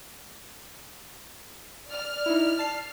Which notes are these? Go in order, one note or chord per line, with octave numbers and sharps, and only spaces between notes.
D5 F6
D#4 E4
A5 C7